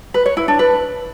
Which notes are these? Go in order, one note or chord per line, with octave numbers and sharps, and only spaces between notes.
B4
C#5
E4
D4
B4